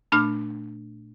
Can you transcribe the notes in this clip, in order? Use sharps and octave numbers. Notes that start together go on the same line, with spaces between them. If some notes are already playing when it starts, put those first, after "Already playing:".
A#2 A3 D4 B5 F6